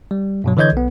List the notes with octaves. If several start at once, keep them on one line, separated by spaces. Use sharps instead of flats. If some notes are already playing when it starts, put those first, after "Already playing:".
G3
G2 B2 F#3
D3 E3 C#5 D#5 G6 G#6
B1 B3